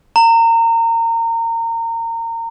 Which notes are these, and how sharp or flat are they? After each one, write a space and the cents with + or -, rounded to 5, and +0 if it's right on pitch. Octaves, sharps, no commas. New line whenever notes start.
A#5 -25